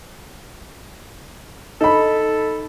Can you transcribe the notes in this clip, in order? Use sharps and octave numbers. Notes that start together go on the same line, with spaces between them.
D#4 A4 B5